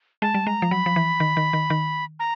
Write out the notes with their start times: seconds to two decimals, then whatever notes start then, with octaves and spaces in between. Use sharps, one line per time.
0.22 G#3 A5
0.34 G3
0.47 G#3 A#5
0.62 F3
0.71 F#3 B5
0.86 F3
0.96 E3
1.20 D#3
1.37 D#3
1.53 D#3
1.70 D#3
2.20 A#5